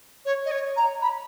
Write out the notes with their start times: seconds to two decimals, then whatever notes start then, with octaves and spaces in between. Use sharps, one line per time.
0.25 C#5
0.45 D#5
0.51 C#5
0.76 A#5
1.01 B5